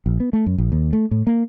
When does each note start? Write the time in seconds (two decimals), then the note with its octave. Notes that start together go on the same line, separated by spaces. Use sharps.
0.06 A#1
0.20 B3
0.33 A3
0.46 F#2
0.58 A#1
0.72 D#2
0.93 A3
1.11 A2
1.27 A#3